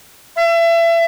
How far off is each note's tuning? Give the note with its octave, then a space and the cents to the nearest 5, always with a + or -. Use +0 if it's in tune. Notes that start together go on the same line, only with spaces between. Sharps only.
E5 +30